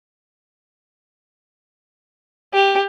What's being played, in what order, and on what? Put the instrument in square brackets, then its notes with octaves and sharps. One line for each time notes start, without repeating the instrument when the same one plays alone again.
[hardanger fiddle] G4